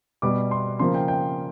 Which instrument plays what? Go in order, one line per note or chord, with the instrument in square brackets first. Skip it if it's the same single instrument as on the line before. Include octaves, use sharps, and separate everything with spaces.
[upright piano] B2 G3 B3 D6
C6
C#3 F3 A#3 C6
G5
G5